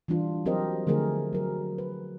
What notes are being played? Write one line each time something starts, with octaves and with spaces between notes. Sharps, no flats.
E3 G3 D4 F4
F#3 C4 G4 A#4 C5 D#5
D3 F3 A3 G#4 A#4
F#3 A#4
B4